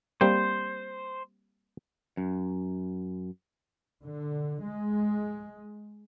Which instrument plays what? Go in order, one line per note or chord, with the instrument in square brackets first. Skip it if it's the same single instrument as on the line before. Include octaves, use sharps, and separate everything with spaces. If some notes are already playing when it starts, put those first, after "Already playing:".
[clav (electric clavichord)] G3 A#3 C4 [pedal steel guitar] C5
[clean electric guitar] F#2
[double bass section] D3
G#3